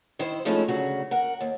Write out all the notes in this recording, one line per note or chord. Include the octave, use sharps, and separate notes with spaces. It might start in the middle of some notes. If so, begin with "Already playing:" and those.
D#3 E4 C5
F3 G#3 A3 C#4 D#4 E4
D2 C#3 F#3 F#4
A#4 F#5
D#2